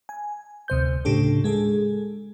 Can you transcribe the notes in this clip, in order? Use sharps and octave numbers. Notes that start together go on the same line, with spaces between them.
G#5
D2 C3 C5 G6
A2 C#3 D4 G4 A4
G#3 G#4 A4